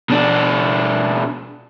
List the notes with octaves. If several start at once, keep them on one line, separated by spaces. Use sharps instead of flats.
B2 D4